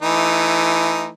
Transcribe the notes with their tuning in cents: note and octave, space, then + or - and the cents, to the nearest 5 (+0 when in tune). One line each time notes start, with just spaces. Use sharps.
E3 +20 A3 +0 D#4 +0